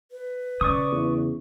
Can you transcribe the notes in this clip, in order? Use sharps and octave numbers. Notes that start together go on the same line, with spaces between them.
B4
C#3 D5 C#6 D#6
E2